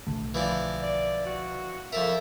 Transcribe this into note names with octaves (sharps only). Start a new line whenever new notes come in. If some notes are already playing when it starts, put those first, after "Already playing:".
B1 D3 A3
E3 F3 D4
D5
F#4
F2 A4 A#4 E5